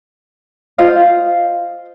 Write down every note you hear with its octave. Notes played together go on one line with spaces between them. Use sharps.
F4 C5 D#5 F5